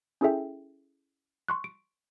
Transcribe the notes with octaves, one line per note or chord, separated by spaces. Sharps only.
C#4 E4 G#4 A4 E5 G5
C6 C#6 F#6
D7